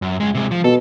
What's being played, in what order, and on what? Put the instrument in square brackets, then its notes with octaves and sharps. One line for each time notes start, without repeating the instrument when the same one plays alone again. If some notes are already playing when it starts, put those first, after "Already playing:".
[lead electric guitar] F#2
C#2 G#3
C3 G#3
F3
[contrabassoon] B2 [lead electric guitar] A4